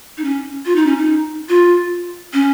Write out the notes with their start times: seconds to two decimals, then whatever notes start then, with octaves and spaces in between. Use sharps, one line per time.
0.17 D#4
0.24 C#4
0.66 F4
0.76 D#4
0.86 C#4
0.97 D#4
1.49 F4
2.33 C#4